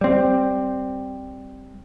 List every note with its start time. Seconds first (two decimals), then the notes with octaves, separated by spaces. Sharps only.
0.01 G3 C4